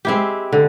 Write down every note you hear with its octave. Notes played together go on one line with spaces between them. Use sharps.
G#3 C4 E4 G4
D3